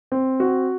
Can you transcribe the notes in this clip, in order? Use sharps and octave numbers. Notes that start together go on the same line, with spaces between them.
C4
F#4